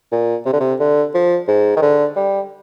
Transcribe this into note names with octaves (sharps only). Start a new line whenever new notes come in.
A#2
C3
D3
C3
D3
F3
G#2
D#3
D3
G3